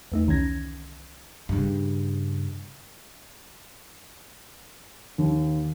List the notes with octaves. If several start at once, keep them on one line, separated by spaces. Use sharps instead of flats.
E2 A3 D#4
C2 D#3 E3 C#4 G#6 A#6
G2 C#3
D#2